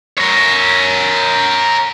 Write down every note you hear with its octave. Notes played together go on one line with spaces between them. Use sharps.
A#4 C#5